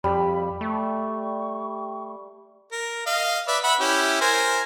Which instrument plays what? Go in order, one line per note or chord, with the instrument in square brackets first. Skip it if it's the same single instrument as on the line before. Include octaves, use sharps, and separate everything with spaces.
[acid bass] F2 [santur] G3 [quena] B5
[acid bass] A3 [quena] C#6
[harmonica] A#4
D#5 F5
B4 D5 E5
E5 F#5 B5
C#4 E4 G4
A#4 C5 G#5